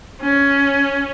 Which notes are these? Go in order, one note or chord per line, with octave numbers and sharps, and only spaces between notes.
C#4